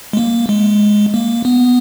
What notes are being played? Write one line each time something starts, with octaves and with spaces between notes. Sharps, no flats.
G#3
A#3
G#3
A#3
B3